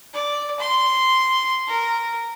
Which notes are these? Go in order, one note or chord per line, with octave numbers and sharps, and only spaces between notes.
D5
C6
A#4